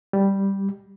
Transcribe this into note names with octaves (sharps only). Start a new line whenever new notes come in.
G3